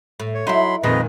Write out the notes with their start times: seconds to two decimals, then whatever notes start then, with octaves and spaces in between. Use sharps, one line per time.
0.20 A2
0.34 C#5
0.47 F#3 D#4 E4 B5 C6
0.83 F2 A#2 D#3 G#3 B4 D#5